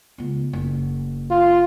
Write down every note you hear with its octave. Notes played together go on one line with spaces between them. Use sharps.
C#2 B3
F#1
F4